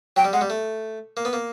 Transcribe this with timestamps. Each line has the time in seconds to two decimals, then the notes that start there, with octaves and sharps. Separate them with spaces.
0.16 F#3 G5
0.25 G3
0.33 G#3 F#5
0.41 G3
0.50 A3
1.17 A#3
1.25 B3
1.33 A#3